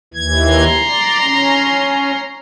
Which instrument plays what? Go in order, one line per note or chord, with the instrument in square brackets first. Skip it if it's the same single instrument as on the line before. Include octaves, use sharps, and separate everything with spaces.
[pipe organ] D#2 E3 G#6
[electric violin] A#5 C6
[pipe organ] D5
C#4